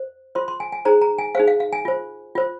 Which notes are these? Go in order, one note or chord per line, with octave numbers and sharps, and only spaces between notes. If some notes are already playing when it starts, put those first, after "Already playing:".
Already playing: C5
F4 C5 C6
C6
G#5
G#5
D#4 G#4 C5 A#5
A#5
G#5
D#4 G#4 C5 F5
F5
F5
G#5
F4 C5
F4 C5